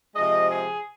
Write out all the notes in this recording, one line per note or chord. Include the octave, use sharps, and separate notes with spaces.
C3 F3 G#3 D#5
G#4